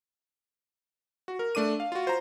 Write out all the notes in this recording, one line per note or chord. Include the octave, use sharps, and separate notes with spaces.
F#4
A#4
A3 D4 D6 D#7
F5
F4 F#4
C5 A#5